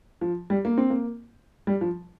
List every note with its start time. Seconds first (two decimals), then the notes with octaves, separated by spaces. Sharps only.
0.21 F3
0.50 G3
0.65 A#3
0.78 C4
0.90 A#3
1.67 G3
1.81 F3